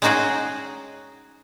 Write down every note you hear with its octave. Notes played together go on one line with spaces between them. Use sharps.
G#3 C#4 D#4 F#4 G#4 G5